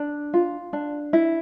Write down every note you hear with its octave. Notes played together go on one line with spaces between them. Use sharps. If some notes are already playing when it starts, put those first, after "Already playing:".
Already playing: D4
F4
D4
E4